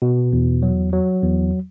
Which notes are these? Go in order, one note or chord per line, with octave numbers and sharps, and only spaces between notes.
B2
E2
F#3
F#3
E2